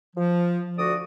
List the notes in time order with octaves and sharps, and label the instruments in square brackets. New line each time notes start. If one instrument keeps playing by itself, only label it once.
[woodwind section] F3
D2 F#4 D5 D#6